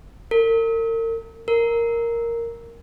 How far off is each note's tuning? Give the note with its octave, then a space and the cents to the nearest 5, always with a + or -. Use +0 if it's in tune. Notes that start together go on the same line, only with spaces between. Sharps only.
A#4 -40
A#4 +0